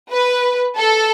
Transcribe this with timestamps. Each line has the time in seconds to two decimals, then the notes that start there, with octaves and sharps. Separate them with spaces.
0.11 B4
0.77 A4